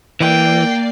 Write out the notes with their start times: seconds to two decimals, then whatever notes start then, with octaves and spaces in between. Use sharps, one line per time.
0.20 E3 A#3 D5 G5 C7